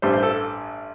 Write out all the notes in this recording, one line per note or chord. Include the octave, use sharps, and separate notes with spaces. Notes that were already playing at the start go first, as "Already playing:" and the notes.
A1 G2 G3 C5
C5
A4